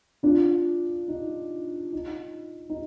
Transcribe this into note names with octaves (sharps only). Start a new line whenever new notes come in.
D4 F4
D#4
D#4
D#4